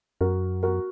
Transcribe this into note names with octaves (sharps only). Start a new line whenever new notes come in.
F#2 F#4 A#4
F#4 A#4